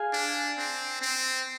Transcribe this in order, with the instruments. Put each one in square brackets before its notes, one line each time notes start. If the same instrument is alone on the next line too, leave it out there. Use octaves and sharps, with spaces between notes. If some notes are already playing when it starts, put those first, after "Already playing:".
Already playing: [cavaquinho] G#4 F5 G#5
[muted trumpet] D4
C4
C4